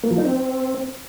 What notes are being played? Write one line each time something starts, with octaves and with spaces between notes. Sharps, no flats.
A#3
F3
D#4
C4